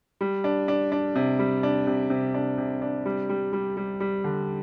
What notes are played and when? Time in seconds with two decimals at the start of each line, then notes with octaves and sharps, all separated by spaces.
0.21 G3
0.44 D4
0.68 D4
0.92 D4
1.16 C3
1.39 G3
1.63 D4
1.87 C3
2.10 C3
2.34 D4
2.58 C3
2.82 D4
3.06 G3
3.29 G3
3.53 G3
3.77 G3
4.00 G3
4.24 D3